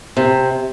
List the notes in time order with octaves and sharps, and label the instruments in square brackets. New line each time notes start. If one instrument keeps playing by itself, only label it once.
[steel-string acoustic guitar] C3